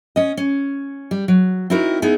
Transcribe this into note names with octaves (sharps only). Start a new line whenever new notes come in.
C#4 D#5
C#4
G3
F#3
C4 D#4 E4 F#4 A#4
B3 D#4 E4 G#4 E5